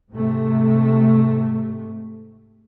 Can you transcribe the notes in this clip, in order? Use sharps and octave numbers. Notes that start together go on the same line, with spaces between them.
G#2 C3 A3